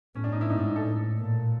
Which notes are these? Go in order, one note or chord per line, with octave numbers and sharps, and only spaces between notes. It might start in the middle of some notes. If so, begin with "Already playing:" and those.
A2 C#4
D4
D#4
E4
G#2 D#4
D4
D#4
A4
A2
A#2